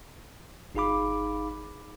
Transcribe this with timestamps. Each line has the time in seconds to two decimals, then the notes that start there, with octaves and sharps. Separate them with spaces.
0.75 G1 D#4 G#4 F5 B5 D6